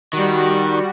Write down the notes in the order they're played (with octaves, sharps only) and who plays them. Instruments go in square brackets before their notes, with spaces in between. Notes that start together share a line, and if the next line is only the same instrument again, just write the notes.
[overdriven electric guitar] D#3 [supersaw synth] G3 F#4